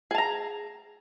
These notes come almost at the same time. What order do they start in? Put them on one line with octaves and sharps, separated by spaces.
G#4 A5 A#5